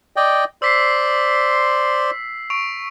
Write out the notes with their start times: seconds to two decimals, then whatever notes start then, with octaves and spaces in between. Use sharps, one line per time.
0.16 D5 D#5 G5
0.62 C5 D5 C6 E6 B6 C7
2.50 C#6 D7 F7